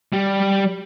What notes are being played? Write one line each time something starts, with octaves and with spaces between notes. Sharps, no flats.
G3